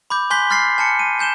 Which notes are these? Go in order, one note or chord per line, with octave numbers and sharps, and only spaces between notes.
B5 D6 G6
G#5 C6 F#6 G6 B6 G7
B5 C6 F6 A6 B6 C7
G#5 A5 F6 C#7
D#7
G#5 G6 E7 G7